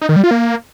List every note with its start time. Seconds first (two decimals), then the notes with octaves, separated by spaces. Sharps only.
0.02 D#4
0.09 D#3
0.16 G3
0.24 F4
0.31 A#3